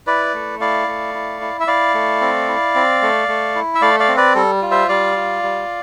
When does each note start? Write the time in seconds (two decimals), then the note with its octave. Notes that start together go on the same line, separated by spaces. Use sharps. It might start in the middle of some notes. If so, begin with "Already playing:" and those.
0.07 E4 B4 D5
0.34 A3
0.61 E4 D5 F5
0.88 A3
1.14 E4
1.41 E4
1.60 E5
1.67 E4 D5 F5
1.94 A3
2.21 C4
2.48 E4
2.75 C4
3.02 A3
3.28 A3
3.55 E4
3.75 E5
3.82 A3 D5 F5
4.00 D5 F5
4.08 C4
4.17 B4 D5
4.35 G3 A4
4.62 F4
4.71 C5 E5
4.89 G3 D5 F5
5.16 F4
5.43 G3